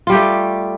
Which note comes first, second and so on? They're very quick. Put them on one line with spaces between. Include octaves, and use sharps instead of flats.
F4 G3 G4 A3